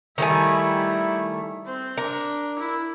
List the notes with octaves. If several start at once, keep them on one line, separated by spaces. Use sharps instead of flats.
D#3 G3 A3 E4 G#5
C4 C5
D4 A#4
E4